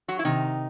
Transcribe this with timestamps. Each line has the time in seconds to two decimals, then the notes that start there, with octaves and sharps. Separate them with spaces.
0.08 F#3 F#4
0.19 E4
0.25 C3 D#3 D#4